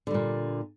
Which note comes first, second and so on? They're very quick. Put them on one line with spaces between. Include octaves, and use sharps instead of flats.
D3 G3 A#2